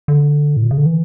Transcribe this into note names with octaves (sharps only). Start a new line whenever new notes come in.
D3
A2
A#2
C#3
D3
E3